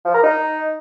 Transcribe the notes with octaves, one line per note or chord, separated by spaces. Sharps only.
F3
A#4
D#4